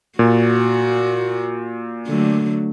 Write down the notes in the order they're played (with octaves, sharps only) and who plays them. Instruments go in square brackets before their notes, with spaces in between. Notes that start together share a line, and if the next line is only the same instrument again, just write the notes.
[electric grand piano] A#2 [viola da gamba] F#4
[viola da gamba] D3 F#3 A3